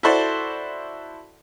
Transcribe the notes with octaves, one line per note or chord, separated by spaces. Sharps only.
E4 F#4 A4 C5 D5